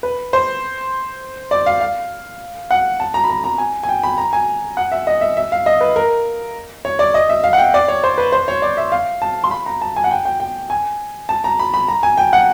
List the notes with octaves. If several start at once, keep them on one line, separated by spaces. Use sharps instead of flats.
B4
C5
D5
F5
F5
F#5
A5
A#5
B5
A#5
A#5
G#5
G#5
G5
B5
A#5
G#5
F#5
E5
D#5
E5
E5
F5
D#5
B4
A#4
C#5
D5
D#5
E5
F5
F#5
G5
D5
C#5
C5
B4
C5
C#5
D5
E5
F5
A5
C6
B5
A#5
A5
G#5
F#5
G5
G5
G5
G#5
A5
A#5
B5
B5
A#5
G#5
G5
F#5